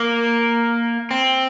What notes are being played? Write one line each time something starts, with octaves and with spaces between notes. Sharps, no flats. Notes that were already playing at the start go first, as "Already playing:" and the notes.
Already playing: A#3
C4